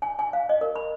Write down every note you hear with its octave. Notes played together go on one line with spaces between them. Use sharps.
G#5
G#5
F5
D#5
A#4
B5